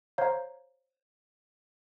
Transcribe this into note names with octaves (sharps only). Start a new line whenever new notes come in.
C5 C#5 F5 A#5